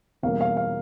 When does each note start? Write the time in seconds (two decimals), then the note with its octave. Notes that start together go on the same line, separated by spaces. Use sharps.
0.23 E2 B2 G3 A#3 C#4 F5
0.41 F5
0.57 F5